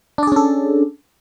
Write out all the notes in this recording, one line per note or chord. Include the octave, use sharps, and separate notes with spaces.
C#4 D4 G#4 A4 D5